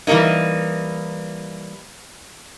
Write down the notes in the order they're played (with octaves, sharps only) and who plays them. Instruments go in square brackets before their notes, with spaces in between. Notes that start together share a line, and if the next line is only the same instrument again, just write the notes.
[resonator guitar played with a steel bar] E3 G3 G#3 A#3 D#4